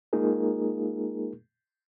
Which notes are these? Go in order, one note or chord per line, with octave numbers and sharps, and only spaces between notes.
G#3 A#3 D#4 F4 G#4 A#4